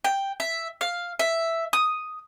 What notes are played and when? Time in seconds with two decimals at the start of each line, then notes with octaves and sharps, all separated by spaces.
0.04 G5
0.40 E5
0.81 F5
1.19 E5
1.73 D#6